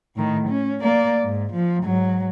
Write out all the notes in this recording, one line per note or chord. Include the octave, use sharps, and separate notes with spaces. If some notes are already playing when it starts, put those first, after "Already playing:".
A2 D#3
C#4
A#3 D5
G#2
F3
G#2 F#3